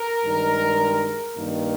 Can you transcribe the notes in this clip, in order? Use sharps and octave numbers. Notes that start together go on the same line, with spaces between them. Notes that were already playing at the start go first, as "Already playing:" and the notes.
Already playing: A#4
G2 D#3 G#3
G2 D#3 A#3